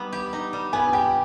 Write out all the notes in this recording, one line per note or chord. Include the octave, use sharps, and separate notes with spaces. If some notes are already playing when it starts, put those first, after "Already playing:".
Already playing: G3 B3 D#4
G4
D#4
G3
B3 G#5
G4 G5